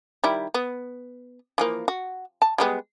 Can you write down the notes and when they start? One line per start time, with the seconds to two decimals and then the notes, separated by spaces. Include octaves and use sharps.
0.24 D#3 G3 E4
0.54 B3
1.58 E3 F3 A#3
1.88 F#4
2.42 A5
2.58 G3 G#3 B3